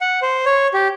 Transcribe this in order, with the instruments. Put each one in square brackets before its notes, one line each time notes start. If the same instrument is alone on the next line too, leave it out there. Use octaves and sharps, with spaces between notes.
[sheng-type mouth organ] F#5
C5
C#5
G4